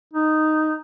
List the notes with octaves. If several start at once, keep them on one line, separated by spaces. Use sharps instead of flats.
D#4